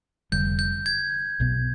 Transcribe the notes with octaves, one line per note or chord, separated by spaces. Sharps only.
F1 F2 D3 G3 G6
G6
G#6
B1 B2 B3